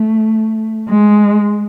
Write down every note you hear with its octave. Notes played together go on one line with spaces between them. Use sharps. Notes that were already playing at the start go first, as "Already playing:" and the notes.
Already playing: A3
G#3